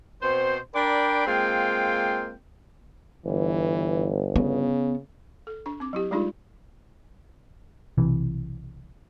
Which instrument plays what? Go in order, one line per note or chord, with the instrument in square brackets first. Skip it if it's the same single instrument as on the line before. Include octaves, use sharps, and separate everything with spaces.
[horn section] B2 C4 C5
D4 A#4 D5 G5 B5
G#3 A#3 C4 F4 G5
[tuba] G1 [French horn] E3
[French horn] C#3 [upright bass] B3
[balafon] A4
D4 C#6
C4 D6
F#3 E4 G4
G3 G#3 D4 D#4 F4 G#4
[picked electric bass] B1 C3 E3